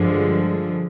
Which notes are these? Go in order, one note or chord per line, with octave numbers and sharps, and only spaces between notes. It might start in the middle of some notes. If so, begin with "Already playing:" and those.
Already playing: G2 D3 F3 G#3